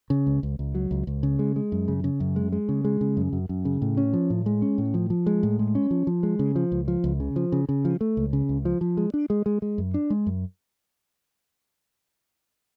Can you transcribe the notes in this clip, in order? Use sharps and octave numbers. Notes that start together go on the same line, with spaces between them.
C#3
C#2
C#2
C#2
F#3
C#2
C#2
C#3
G#3
G#3
F#2
C#3
C#3
F#2
G#3
G#3
C#3
G#3
C#3
F#2
F#2
F#2
C#3
A2
C#4
F3
A2
G#3
C#4
A2
F3
F3
G#3
A2
G#3
C#4
F3
F3
G#3
C#3
F3
C#2
F3
C#2
C#3
F3
C#3
C#3
F3
A3
C#2
C#3
C#2
F3
F3
G#3
D4
G#3
G#3
G#3
F#2
D4
G#3
F#2